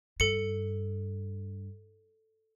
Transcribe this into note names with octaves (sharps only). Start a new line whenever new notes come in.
G2 A4 C#7